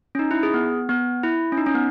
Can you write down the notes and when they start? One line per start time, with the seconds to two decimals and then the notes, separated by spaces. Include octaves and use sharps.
0.15 C#4
0.19 D#4
0.31 E4
0.43 G#4
0.54 B3
0.89 B3
1.23 E4
1.52 C#4
1.58 D#4
1.66 C#4
1.74 B3